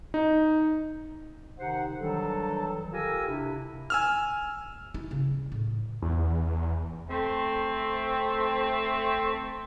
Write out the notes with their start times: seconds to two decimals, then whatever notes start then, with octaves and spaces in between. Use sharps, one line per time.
0.14 D#4
1.59 C3 D#3 D#4 C5 F#5
1.99 D#3 E3 F#3 G3 D4 A4
2.92 F4 G4 A4 A#4 G#5 E6
3.28 C3 D4 E4
3.90 G#5 E6 F6
4.94 E4
5.11 C#3
5.52 A2
6.02 E2
7.09 A3 C4